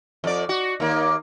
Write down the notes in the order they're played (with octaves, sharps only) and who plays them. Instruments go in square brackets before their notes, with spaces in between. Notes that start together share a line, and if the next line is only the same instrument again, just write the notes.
[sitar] F2 D5
F#4
D#2 A#3